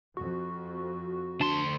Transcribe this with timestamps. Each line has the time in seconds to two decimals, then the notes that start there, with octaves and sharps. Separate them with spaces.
0.17 F2 F#4
1.41 D2 D4 A5 C6